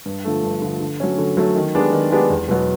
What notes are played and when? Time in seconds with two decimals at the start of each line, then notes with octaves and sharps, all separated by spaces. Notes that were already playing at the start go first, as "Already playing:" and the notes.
0.06 G2
0.25 D3 F3 A3
0.43 G2
0.62 D3 F3 A3
0.80 D3
1.00 F#3 A3 C#4
1.18 D3
1.37 F#3 A3 C#4
1.56 D#3
1.75 G#3 B3 D4 G4
1.92 D#3
2.11 G#3 B3 D4 G4
2.30 E2
2.48 B2 F#3 B3